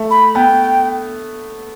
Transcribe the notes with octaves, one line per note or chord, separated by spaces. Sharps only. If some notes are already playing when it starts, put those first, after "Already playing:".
Already playing: A3
B5
B3 G5